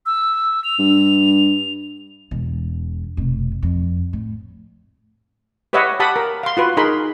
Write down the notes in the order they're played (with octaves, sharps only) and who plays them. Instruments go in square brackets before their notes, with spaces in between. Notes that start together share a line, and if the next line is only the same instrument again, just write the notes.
[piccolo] E6
F7
[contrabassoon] G2
[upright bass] E1 E2
F1 B2
F2
A2
[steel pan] G4 B4 C#5 D#5 E5 F#5
G4 F#5 A5 B5 D#6
A#4
F5 C6
F4 F#4 B4
D#4 G#4 A#4 B5 C6